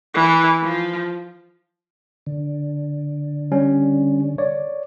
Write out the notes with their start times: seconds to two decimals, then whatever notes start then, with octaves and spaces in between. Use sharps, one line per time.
0.15 E3
0.63 F3
2.26 D3
3.52 G3 C#4
4.38 C#5 D5